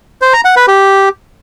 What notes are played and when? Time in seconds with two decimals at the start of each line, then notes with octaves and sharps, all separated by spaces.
0.22 C5
0.33 A#5
0.45 F#5
0.56 B4
0.68 G4